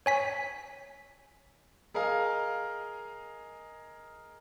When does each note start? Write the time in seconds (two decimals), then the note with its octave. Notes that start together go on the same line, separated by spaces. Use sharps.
0.06 C#5 G#5 B6
1.94 G#4 A#4 D#5 F5 G#5